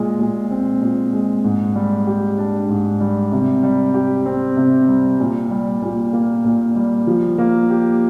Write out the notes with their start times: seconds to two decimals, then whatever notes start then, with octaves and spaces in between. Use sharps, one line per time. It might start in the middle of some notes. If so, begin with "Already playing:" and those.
Already playing: A#2 G#3
0.19 A#2
0.50 C4
0.82 A#2
1.13 G#3
1.44 G#2
1.75 G3
2.07 G4
2.38 D4
2.69 G#2
3.00 G3
3.32 C3
3.63 G3
3.94 G4
4.25 C4
4.57 C3
4.88 G3
5.20 A#2
5.51 G3
5.82 A#2
6.13 A#3
6.45 A#2
6.76 G3
7.07 F3
7.38 A#3
7.70 G4